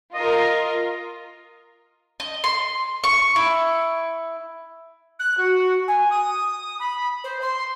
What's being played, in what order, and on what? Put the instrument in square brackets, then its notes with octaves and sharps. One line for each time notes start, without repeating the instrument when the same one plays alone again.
[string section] F4 A#4 [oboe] D#5
[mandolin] D#5
C6
C#6
E4
[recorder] F#6
F#4
G#5
D#6
B5
C5
C6